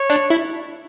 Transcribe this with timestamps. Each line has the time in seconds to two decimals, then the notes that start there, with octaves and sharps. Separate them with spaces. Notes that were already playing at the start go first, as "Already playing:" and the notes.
Already playing: C#5
0.10 D4
0.30 E4